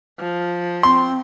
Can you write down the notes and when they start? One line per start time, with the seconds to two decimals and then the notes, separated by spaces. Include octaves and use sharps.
0.19 F3
0.83 C4 C6